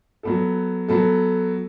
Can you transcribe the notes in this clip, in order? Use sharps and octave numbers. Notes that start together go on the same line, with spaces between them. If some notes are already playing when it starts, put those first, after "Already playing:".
F#3 B3 A4
F#3 B3 A4